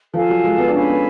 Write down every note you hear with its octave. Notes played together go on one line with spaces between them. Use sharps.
F3 A4 F5 G#5
F#3
G#3
B3
D4
C#4 A4 F5 G#5 B5
B3